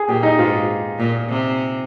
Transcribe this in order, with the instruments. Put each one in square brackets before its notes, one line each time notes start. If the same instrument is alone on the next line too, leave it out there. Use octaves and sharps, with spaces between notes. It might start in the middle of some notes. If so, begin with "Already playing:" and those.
Already playing: [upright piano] G#4
[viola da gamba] A#2 [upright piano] G4
[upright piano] D#4
[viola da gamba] G#2 [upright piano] F4
[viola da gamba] A#2
C3